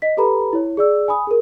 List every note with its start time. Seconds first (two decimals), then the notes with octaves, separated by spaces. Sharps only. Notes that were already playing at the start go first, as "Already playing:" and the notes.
0.02 D#5 B6
0.17 G4 A4 B4 A#5 B5
0.53 E4 C#5
0.77 G#4 D5 E6
1.08 G#5 B5 D#6
1.27 G#4 A#4